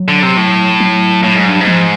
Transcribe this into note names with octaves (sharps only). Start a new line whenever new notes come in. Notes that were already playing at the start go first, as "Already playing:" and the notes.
Already playing: F#3
D3
C3
A2
F#3
A2
G#2
G2
G#2
F3